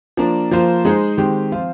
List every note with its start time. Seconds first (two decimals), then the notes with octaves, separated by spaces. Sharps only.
0.17 F3 A#3 D4
0.51 F3 A#3 F4 C5
0.85 G#3 D#4 G#4 C5
1.17 D#3 G#3 C4 G4
1.52 F3 C4 F4 C5